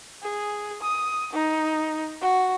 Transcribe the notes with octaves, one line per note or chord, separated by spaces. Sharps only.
G#4
D#6
D#4
F#4